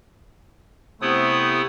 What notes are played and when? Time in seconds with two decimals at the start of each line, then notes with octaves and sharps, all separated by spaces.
1.02 C3 A3 B3 E4 D#6